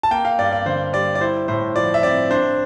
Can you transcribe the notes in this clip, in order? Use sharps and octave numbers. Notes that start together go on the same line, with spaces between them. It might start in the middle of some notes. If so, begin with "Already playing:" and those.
A5
A#3 G5
F5
G2 D5
D5
D3 C5
G3 D5
D5
E4 C5
A2 C5
F3 D5
E5
C4 D5
D4 C5